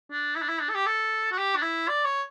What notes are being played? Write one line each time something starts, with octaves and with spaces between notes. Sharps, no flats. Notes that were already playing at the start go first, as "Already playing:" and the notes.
D4
E4
D4
E4
D4
A4
G4
A4
F#4
G4
D4
E4
D5
C#5